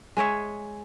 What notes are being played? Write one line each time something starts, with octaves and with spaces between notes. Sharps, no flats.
G#3 G#4 C#5 E5